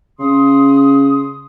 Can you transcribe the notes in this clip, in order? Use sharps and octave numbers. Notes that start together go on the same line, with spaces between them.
C#3 C6 D#6